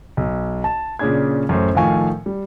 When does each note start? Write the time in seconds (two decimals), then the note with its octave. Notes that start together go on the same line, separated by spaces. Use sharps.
0.17 B1
0.64 A5
0.99 A#2 C#3 C#4 D4 G#4 G#6
1.49 A1 F#2 F#3 A3 C5 C#5
1.75 A2 D#3 F3 F5 G#5 C#6
2.26 G3